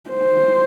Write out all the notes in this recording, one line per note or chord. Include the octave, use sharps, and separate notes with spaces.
C5